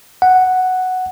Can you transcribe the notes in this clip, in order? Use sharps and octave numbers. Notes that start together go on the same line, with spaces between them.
F#5